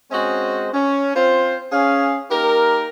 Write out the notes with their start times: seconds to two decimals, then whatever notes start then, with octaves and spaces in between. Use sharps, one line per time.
0.11 G#3 C4 C#4 F#4 C5 D#5
0.74 C#4
1.15 C4 F4 C5
1.72 C#4 G#4 F5
2.31 A#3 D#4 G4 A#4